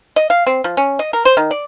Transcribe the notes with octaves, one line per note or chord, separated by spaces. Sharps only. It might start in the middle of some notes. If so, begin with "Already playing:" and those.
D#5
F5
C4
F3
C#4
D#5
A#4
C5
D#3
D5